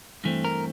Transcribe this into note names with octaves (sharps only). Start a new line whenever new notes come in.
G2 E3 A3 C4
A#4